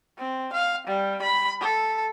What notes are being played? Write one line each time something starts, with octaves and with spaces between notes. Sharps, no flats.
C4
F5
G3
B5
A4